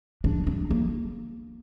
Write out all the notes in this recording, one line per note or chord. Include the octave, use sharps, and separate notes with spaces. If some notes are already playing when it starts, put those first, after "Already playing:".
D4
D4
A#3